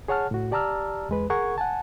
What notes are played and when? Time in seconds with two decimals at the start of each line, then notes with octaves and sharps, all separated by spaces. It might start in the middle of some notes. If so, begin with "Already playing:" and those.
0.08 G#4 C#5 F#5 A5 F6
0.31 A2 F#4
0.51 G4 D5 A5 A#5 E6 F6
1.09 E2 G#3 B4
1.30 G#4 A#4 F#5 C#6 G#6
1.58 F#5 G#5 A5